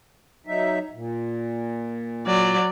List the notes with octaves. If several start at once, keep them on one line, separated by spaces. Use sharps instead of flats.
F#3 D#4 E5
A#2
F#3 D5